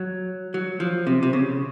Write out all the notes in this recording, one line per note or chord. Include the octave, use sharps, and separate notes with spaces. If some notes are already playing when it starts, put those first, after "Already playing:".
Already playing: F#3
F#3
F3
C3
C3
C#3